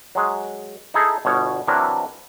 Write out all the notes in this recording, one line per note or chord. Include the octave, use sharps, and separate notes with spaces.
F#3 G#3
D#4 E4 G#4 A4
G1 B2 C#5
C3 E3 F#3 D4 E4 A#4